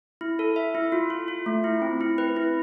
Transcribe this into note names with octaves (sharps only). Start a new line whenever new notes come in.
E4
A4
E5
E4
F4
F4
F4
A3
E4
C4
E4
B4
E4